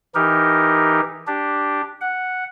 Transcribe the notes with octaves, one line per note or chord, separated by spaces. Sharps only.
E3 D#4 G4 A#4
D4 G4
F#5